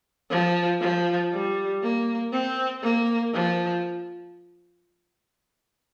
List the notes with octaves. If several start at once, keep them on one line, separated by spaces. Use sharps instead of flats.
F3
F3
G3
A#3
C4
A#3
F3